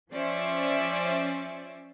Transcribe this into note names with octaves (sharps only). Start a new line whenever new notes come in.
F3 C#4 C5 D5 E5